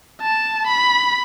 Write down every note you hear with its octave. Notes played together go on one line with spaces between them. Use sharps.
A5
B5